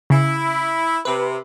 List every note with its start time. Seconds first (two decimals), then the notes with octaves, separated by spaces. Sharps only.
0.10 C#3 E4
1.05 C3 B4